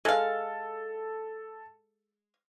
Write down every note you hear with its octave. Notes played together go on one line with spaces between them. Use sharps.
G#3 A4 F5